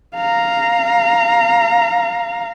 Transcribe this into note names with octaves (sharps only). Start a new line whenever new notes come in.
F5 A#5